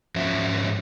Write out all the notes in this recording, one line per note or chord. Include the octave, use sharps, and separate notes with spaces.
G#2 F3 C#4 F#4 C#5 E5